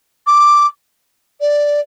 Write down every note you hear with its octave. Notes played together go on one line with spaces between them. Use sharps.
D6
D5